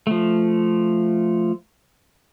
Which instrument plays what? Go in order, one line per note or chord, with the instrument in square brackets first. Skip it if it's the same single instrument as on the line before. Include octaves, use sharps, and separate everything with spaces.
[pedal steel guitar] F3 A3